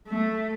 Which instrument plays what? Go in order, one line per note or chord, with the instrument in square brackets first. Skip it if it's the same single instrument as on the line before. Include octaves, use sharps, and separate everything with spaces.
[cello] A3